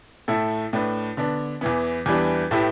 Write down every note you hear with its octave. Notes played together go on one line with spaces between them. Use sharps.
A2 A3 E4 A4
A2 A3 D4 B4
D3 B3 D4
E2 E3 B3
E2 E3 G3 D4 B4
A2 A3 E4 G4 B4